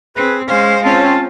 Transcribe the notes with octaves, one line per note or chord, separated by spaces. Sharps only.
C4 G#4 B4
G#3 C#4 C5 F5
C4 C#4 F4 A5